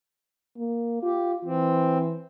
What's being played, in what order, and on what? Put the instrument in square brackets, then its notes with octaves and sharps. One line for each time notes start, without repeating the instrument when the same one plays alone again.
[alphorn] A#3
[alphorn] F4 [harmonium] G4
[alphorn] E3 [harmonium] C4